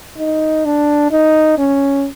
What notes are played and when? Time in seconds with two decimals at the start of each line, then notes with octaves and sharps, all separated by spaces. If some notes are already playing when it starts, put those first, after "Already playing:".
0.18 D#4
0.65 D4
1.12 D#4
1.58 C#4